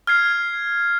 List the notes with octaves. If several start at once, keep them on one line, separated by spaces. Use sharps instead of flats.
F6 G#6 C7